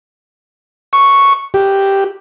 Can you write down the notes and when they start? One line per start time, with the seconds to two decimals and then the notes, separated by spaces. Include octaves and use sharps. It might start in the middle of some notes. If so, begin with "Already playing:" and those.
0.93 C#6
1.54 G4